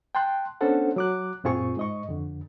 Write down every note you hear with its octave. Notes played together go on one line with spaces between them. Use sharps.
G5 A5 C6 F#6
B3 C#4 D4 A4 C5 F#5
F#3 D6 F#6
F#2 A#2 C4 F4 G#4 C#6
G#2 D#5 C#6
F2 D3